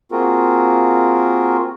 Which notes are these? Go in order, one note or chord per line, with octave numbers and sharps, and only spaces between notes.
A#3 C4 F4 F#4 G#4 A#4